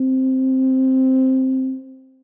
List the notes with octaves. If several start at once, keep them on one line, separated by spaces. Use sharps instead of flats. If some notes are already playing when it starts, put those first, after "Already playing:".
Already playing: C4